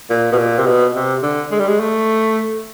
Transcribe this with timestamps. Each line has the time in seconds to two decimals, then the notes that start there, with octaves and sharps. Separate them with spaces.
0.10 A#2
0.32 B2
0.38 A#2
0.59 C3
0.66 B2
0.95 C3
1.23 D3
1.51 G#3
1.59 G3
1.68 G#3
1.80 A3